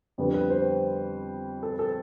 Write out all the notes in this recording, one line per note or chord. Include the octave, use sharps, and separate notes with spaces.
F2 D3 G3 B3
B4
C5
A4
A4